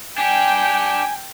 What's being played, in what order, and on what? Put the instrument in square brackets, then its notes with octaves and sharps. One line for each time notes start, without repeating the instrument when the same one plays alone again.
[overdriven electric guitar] D4 G4 [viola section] G5 [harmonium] G#5